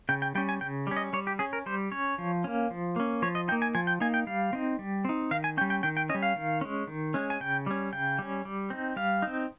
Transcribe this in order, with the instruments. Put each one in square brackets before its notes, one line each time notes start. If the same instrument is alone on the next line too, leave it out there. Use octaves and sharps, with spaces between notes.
[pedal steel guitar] C#3 G5
G5
G3 C#4 G5
G#5
C#3 G5
G3 C#4
D#5
G3 C#5
G4
C#4 G#4
A#4
G3 C5
C#4 C#5
F3
A#3 C#4
F3
A#3 C#4
F3 C#5
D#5
D#4 G5
A#3
G#5
F3 G#5
G5
A#3 D#4 G#5
G5
G3 F5
C4 D#4
G3
C4 D#4
D#3 F5
G#5
C#4 G5
G3
G5
D#3 G5
G5
C#4 D#5
G3
F5
D#3
G#3 C#4
D#3
G#3 C#4
G#5
C#3 G5
G3 C#4
C#3 G5
G3 C#4
G3
C4 D#4
G3 F5
C4 D#4